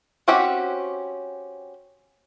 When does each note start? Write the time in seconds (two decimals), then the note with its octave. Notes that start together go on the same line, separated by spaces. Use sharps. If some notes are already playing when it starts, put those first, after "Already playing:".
0.28 C4 C#4 F#4 G4 E5